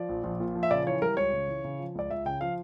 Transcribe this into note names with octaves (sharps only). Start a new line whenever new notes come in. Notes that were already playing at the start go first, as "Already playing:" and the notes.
Already playing: F3 D5
A#1
A#1
A#2
F3
E5
C#3 D5
E3 C#5
G3 A#4
C#2 C#5
C#3
E3
C#3
F3
C#2 D5
C#2 E5
C#3 G5
F3 F5